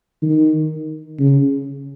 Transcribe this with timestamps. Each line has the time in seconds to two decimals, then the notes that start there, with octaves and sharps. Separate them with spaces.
0.22 D#3
1.19 C#3